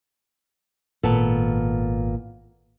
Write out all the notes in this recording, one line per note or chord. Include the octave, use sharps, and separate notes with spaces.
D#1 G#1 A#2 B3 A4